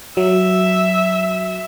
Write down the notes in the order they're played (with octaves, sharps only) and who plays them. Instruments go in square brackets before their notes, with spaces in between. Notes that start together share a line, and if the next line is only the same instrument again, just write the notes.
[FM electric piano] F#3 [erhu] E5